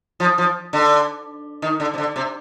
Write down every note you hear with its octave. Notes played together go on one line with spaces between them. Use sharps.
F3
F3
D3
D#3
D3
C3
D3
C3